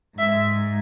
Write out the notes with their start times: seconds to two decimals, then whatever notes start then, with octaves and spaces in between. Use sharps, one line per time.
0.18 G#2 G#3 E5